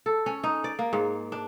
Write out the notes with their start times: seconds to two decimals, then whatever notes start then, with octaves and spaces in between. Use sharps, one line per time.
0.06 A4
0.26 C#4
0.44 D#4
0.64 D5
0.79 A#3
0.93 G#2
1.32 D4